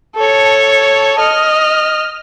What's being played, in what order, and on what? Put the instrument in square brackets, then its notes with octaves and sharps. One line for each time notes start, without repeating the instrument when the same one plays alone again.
[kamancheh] A4 C#5
D#5 F6